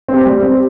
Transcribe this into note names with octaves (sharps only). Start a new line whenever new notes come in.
C4
G4
G3
C4
G4